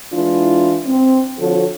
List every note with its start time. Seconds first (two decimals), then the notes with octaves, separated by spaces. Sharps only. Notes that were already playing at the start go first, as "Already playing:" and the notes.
0.13 E3 G#3 D4 E4 F4
0.85 C4
1.39 D3 F3 F#4 A4 C#5